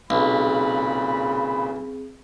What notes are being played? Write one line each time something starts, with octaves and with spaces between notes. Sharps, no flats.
B1 A#2 C#3 C4 G#4 B5